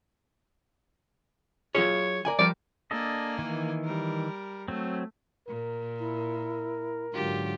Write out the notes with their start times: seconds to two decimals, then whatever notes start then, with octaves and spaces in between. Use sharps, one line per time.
1.75 F#3 F4 G#4 C#5
2.25 A#4 D5 G#5
2.39 F3 G3 A#4 D5
2.91 A#3 D4 A4 D#5 G#5
3.39 D#3 E3
3.84 G3 A#4
4.68 F#3 A3 C4
5.48 A#2 A#4
5.99 E4
7.14 G#2 D3 F#3 F4 G4